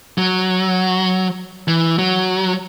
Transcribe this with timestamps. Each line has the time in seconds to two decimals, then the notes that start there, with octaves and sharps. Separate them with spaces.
0.18 F#3
1.68 E3
1.99 F#3